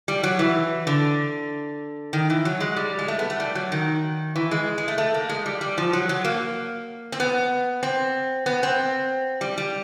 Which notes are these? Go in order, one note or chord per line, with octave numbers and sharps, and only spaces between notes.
G3
F#3
E3
D3
D#3
E3
F#3
G#3
G3
G#3
A3
B3
A3
G3
F#3
D#3
E3
G#3
G#3
A3
A3
A#3
G#3
G3
G3
F3
F#3
F#3
A#3
C4
B3
C4
B3
C4
G3
G3